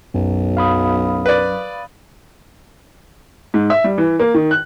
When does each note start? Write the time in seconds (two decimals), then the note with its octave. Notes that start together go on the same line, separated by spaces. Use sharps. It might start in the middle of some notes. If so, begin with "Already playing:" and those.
0.14 B1 F#2
0.57 F5 B5 D#6
1.26 B4 D5
3.54 G#2
3.70 E5
3.84 G3
3.98 E3
4.20 A#3
4.34 D#3
4.51 F#6